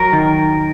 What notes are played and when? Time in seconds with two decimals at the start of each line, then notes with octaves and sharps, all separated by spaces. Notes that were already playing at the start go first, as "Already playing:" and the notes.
Already playing: F#3 A#4
0.13 D#3